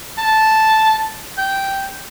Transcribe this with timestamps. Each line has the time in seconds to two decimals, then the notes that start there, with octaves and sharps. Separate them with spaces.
0.18 A5
1.38 G5